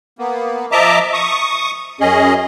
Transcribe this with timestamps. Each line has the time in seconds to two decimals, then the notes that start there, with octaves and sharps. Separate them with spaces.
0.19 A#3 B3
0.72 F3 D#5 E5 A5 A#5 D6
1.13 C#6 D#6
2.00 F#2 C#4 G#4 D#5